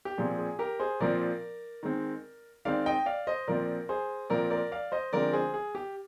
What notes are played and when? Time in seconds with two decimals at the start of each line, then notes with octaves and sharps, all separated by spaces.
0.05 G4
0.18 A#2 F3 C4 G#4
0.38 G#4
0.59 G4 A#4
0.80 G#4 C5
1.00 A#2 F3 C4 A#4 D5
1.83 D#3 G#3 C4
2.65 D#3 G#3 C4 D5 F5
2.86 D#5 G5
3.06 D5 F5
3.27 C5 D#5
3.48 A#2 F3 C4 A#4 D5
3.89 G#4 C5
4.30 A#2 F3 C4 A#4 D5
4.50 A#4 D5
4.71 D5 F5
4.92 C5 D#5
5.13 D3 F3 G#3 C4 A#4 D5
5.33 G#4 C5
5.54 G#4
5.75 G4